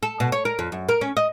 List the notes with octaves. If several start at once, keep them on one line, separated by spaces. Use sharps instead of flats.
A4
B2
C#5
A#4
F2
F#2
A#4
C#4
D#5